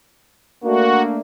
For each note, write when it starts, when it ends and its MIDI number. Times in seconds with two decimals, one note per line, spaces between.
0.64 1.20 57
0.64 1.20 58
0.64 1.20 62
0.64 1.02 66